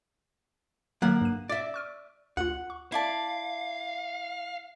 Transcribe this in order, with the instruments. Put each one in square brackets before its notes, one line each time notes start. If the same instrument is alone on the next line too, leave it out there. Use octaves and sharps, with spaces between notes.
[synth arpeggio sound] D3 F#3 [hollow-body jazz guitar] A#3 F#5
[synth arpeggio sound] G2 D#7
[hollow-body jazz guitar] D5 E5
[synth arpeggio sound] C#6 F6 D7
[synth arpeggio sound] D2 F4 [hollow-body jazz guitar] F#5
[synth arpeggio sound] C#6
[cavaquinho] E4 D5 A5 [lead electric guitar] F5